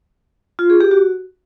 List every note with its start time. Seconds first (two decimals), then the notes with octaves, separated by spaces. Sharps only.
0.59 F4
0.70 G#4
0.80 G4
0.91 F#4